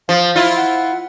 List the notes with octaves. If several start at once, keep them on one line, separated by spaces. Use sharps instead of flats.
F3 F5
E4 F4
F#5